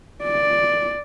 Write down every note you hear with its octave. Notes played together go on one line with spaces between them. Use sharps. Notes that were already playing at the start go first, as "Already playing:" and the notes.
D5